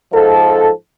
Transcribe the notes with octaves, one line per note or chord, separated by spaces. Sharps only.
G#2 F3 A4